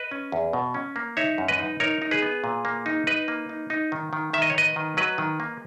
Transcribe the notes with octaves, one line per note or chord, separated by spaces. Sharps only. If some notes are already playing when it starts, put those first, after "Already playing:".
Already playing: B4 D#5
C#4
E2
B2
C#4
A#3
D#4 C#5 E5
F#2
B4 D#5
D#4
D#4 A#4 C#5
D#4
G#4 B4
B3
A#2
A#3
D#4
D#4 B4 D#5
A#3
D#4
D#4
D#3
D#3
D#3 E5
D#5
C#5
D#3 B4 D#5
D#3
F#3 B4 D#5
D#3
A#3